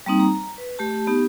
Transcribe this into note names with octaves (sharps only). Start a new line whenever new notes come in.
G3 A#3 C4 D#4
A#5
B4
A3 G4 A5
B3 D#4 G4